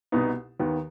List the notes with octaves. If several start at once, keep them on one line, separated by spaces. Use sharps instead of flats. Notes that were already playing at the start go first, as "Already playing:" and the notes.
C2 B2 B3 D#4
D#2 D#3 B3